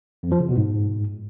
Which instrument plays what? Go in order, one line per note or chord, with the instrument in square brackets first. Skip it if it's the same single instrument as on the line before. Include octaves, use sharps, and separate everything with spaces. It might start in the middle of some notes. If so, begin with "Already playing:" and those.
[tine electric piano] F2
F3
C#3
B2
G#2